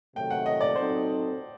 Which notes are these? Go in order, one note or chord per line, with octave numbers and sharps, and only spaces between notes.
C3 D#3 F#3 A3 G5
F#5
D#5
D5
F#3 C4 D#4 A4 C5